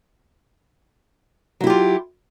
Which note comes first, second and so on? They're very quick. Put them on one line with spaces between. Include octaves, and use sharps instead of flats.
F#3 E4 G4 F4